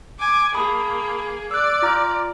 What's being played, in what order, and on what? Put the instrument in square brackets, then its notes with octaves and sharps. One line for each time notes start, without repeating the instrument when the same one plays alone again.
[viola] G#5 D6
[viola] A#3 G#4 [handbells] A5 B5 D#6
[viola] D5 [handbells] E6 F#6
[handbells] F4 A#5 F6